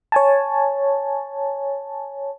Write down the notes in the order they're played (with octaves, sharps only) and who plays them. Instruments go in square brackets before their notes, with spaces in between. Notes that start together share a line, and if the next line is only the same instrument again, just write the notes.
[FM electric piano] C#5 G#5 A5